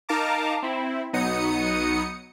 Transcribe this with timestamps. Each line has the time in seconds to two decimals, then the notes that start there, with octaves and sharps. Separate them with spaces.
0.09 D#4 A#4 F5 A5 A#5 D6
0.62 C4 E4
1.13 B1 F#3 B3 D#4 D#6 C#7